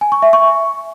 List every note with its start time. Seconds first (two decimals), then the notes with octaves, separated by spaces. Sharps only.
0.01 G#5
0.12 C#6
0.22 E5
0.33 C#6